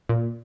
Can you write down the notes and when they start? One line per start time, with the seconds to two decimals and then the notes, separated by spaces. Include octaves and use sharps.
0.09 A#2